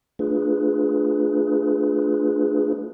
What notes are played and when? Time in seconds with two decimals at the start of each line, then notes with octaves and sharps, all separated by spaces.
0.19 A3 D4 F4 G#4 B4